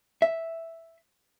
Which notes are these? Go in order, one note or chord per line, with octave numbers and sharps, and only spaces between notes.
E5